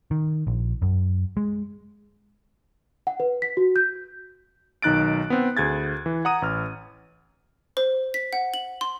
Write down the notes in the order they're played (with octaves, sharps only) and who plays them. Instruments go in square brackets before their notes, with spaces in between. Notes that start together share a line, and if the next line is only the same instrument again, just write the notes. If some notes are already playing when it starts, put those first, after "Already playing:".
[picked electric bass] D#3
A#1
F#2
G#3
[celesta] F#5
B4
B6
F#4
G6
[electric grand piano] B1 D#3 D#4 F#6 A6 D7
B3 C4
D2 G#4 G#6 A6
E3
F#5 A#5 D#6 D#7
A1 F6
[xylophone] C5
B6
F#5
F#7
C6